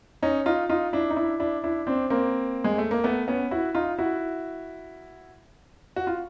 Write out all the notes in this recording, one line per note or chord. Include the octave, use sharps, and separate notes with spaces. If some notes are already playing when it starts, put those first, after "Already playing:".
C#4 D#4
D#4 F4
D#4 F4
D4 E4
D#4
D4 E4
D4 E4
D4 E4
C4 D4
A#3 C4
G#3
A3
A#3
A3 B3
B3 C#4
E4 F#4
D#4 F4
E4 F#4
F#4
F4